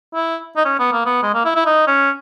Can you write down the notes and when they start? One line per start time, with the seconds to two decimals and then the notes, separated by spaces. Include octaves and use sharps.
0.14 E4
0.57 D#4
0.65 C#4
0.79 B3
0.93 A#3
1.06 B3
1.23 G#3
1.34 A#3
1.45 E4
1.55 E4
1.66 D#4
1.87 C#4